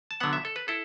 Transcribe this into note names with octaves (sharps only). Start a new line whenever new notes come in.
A5
D3 F#3 B3 F#5
E5
A4
B4
E4 A4